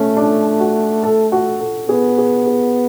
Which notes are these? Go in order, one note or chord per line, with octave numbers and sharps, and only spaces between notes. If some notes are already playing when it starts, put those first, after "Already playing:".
Already playing: A3 C#4
D4
F#4
A4
F#4
A4
B3 G#4
G#4
G#4